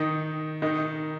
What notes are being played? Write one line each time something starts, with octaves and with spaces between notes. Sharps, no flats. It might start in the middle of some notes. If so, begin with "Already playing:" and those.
Already playing: D#3 D#4
D#3 D#4